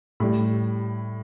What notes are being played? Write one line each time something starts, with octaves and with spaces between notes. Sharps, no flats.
A2 G3